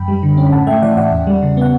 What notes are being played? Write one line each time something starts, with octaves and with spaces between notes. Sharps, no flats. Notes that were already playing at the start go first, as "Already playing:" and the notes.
Already playing: F#2 G5 B5
G3
D3
C#4
B5
A2 F#5 A5
A3 E5 G5
E3 D5 F#5
A2 D5 F#5
E2
G3
C#3
B3 F#5